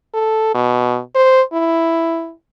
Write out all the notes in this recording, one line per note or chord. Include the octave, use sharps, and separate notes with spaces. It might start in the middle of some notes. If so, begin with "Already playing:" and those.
A4
B2
C5
E4